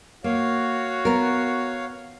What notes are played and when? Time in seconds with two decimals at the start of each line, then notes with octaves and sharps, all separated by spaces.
0.24 A#3 F#4 C#5 F5
1.05 B3 A#4